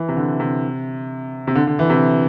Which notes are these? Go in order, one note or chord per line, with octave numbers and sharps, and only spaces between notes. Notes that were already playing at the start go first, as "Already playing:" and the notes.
Already playing: E3
C3
D3
C3
C3
D3
D3
E3
C3